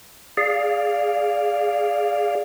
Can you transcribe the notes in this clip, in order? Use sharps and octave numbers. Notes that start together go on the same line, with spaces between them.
G#4 D5 F5